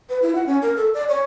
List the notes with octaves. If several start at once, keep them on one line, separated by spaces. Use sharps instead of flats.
B4
E4
F#5
C#4
A#4
A4
D5
C#5